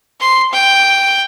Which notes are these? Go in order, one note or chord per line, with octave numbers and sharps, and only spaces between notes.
C6
G5